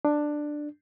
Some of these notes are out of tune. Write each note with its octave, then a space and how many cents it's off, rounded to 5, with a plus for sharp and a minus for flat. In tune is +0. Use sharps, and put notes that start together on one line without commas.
D4 +10